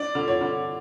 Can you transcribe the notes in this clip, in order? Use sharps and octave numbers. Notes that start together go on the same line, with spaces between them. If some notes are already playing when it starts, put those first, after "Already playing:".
Already playing: D4 D5
D3
C#5
D3